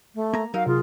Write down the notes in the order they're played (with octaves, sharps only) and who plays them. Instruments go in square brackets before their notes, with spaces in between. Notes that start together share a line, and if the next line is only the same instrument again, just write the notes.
[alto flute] A3
[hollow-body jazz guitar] A#3 A#5
[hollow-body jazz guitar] F#3 D#4 A#4 [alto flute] F#4 [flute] F5
[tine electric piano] C3 [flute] F4 [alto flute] G#4